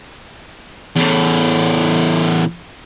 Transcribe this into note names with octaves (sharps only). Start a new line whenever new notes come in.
E2 A2